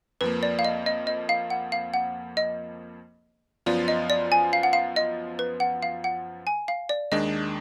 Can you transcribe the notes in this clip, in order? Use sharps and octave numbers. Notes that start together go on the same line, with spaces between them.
F2 F3 A#3 B4
D5
F5
D#5
D#5
D#5
F5
F#5
F5
F#5
D#5
F#2 F3 B3 F4 D5
D#5
D5
G#5
F5
F#5
F5
D#5
B4
F#5
F5
F#5
G#5
F5
D5
D#2 D#3 G#3 D4 D#5